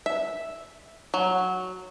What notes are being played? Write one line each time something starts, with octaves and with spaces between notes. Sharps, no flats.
E5
F#3